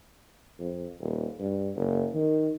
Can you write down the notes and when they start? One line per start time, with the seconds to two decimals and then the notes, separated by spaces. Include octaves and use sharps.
0.59 F2
1.00 D#1
1.39 G2
1.76 F#1
2.14 D#3